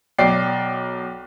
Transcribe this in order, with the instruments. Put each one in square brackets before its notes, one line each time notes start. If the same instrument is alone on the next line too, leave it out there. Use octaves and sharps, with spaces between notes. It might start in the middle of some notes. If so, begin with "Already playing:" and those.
[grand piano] B1 D5 G5 C7